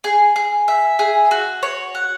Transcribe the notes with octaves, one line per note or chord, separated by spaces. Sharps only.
G#4
G#4
E5
G#4
F#4
C#5
F#5